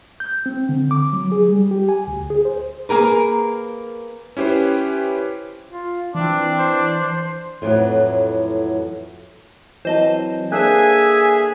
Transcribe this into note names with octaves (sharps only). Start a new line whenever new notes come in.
G6
C4
D3
D6
F#3
G#4
G3
G4
G#5
D2
G#4
C5
A#3 G#4 A#4 B4
C#4 E4 G4 B4 C5
F4
E3 C4 D4
C5
F2 A2 C3 E3 F#3
E3 F#3 C4 C5 D#5 A5
A#3 D4 G#4 A4 C5 E5 G#5 F#6